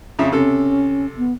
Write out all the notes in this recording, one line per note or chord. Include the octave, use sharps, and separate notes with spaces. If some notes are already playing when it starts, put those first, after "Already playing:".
F2 C#3 E5
C3 C#4 A4
B3